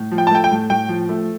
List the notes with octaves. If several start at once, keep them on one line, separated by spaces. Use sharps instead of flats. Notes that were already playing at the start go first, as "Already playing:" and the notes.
Already playing: A2
F3
G5
A5
A3 G5
G5
A2
A2 G5
F3
A3